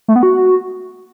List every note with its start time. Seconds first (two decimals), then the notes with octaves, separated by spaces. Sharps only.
0.08 A3
0.16 B3
0.23 F#4